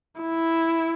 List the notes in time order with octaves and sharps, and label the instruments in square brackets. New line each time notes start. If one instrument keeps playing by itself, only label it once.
[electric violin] E4